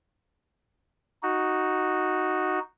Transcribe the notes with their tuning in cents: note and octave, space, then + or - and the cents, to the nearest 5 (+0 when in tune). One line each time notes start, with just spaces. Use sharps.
D#4 +0 F#4 +0